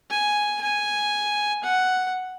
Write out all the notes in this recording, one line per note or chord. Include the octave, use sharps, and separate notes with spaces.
G#5
G#5
F#5